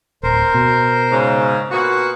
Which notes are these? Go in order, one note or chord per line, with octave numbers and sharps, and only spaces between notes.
D1 A#4 C5
B2
G#2 C#3
C#4
A#2 B3 F#4 C#6